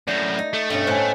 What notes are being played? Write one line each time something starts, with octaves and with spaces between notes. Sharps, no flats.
F#2 A2 A3 D5 G6 A#6
D#4
A3 A4
G2 B2 A3 C#4
A2 C5 F#5 G#5